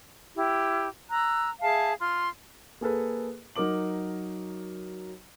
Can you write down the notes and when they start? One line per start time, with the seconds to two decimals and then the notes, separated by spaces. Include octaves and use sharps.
0.35 E4 G4
1.10 A#5 E6 F#6
1.61 G#4 E5 F5 A5
2.00 F4 C6
2.81 A#3 G#4 A4 B4
3.56 F#3 D#4 A#4 D6 F#7